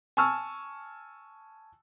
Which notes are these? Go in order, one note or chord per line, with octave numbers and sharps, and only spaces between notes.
G#5 A5 C#6 E6 F6